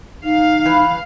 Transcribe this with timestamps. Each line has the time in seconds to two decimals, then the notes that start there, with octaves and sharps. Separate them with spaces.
0.24 D#4 F5
0.66 E3 B4